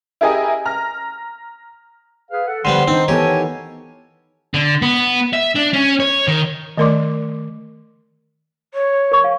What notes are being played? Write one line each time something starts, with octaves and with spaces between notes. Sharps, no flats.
E4 G4 G#4 A#4 D#5 G#5
A#5 F6
G#4 B4 F5
A4 F#5
D3 F3 G3 B3 C6
D#3 C4 D4 D#4 C5
E3 B3 G4 A4 A#4 C#5 G#5 A#5
D3
B3
E5
D4
C#4
C#5
D#3
D#3 A3 A#4 D5 C6 D6
C#5
A#4 C#6
F5